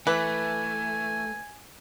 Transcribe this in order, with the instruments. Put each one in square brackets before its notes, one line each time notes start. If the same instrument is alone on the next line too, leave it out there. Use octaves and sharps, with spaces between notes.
[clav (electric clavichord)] E3 [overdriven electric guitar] A3 [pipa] B4 [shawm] G#5